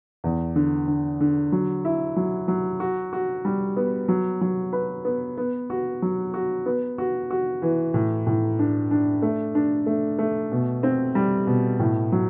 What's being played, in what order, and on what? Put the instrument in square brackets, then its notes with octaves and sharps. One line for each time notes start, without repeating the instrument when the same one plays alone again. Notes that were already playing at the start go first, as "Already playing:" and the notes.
[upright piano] E2
D3
D3
D3
F#3
E4
F#3
F#3
F#4
F#4
G3
B3
F#3
F#3
B4
B3
B3
F#4
F#3
F#4
B3
F#4
F#4
E3
A2
A2
D4
D4
A3
D4
A3
A3
B2
C4
G3
B2
A2
F#3